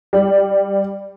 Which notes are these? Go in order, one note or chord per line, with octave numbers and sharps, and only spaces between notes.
G3